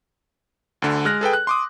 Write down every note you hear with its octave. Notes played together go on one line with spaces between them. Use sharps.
D2 D3
G#3 F6 F#6 A#6
G#4 A4 B4 G5
F#6
C6 D6 D#6